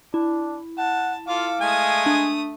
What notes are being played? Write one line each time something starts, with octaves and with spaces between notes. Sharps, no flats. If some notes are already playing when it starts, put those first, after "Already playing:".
D4 E4
F#5 A5
F4 A4 F5 D6
G#3 A3 G#5 D#6
D4